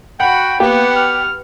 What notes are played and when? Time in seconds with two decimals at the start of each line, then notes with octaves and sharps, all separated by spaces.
0.20 F#4 F#5 G5 B5
0.60 A#3 B3 G4 F#5
0.96 F6